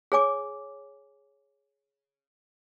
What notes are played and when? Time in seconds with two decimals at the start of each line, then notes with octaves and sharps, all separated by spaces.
0.12 G#4 C#5 G#5 D6